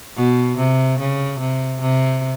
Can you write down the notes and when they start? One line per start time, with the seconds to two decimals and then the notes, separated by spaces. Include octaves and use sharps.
0.17 B2
0.58 C3
1.00 C#3
1.40 C3
1.81 C3